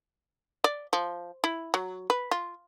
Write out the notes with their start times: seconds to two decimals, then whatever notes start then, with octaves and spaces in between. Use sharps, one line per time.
0.64 D5
0.93 F3
1.44 E4
1.74 F#3
2.10 B4
2.31 F4